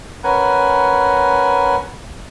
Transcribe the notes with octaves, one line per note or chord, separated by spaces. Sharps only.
C#4 A#4 B4 F#5 G#5